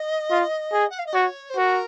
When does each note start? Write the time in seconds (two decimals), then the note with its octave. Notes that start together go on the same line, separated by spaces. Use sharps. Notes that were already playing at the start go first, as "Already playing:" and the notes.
Already playing: D#5
0.31 F4
0.72 G#4
0.90 F#5
0.98 F5
1.06 D#5
1.14 F#4 C#5
1.50 C5
1.56 F#4 A#4